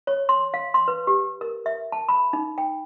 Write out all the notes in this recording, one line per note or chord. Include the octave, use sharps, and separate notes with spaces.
C#5
C6
F5
C6
B4
G4
A#4
E5
A5
B5
D#4
G5